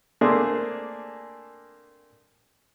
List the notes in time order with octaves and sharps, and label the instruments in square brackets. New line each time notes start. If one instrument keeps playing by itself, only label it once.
[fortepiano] A3 A#3 C4 D4 G#4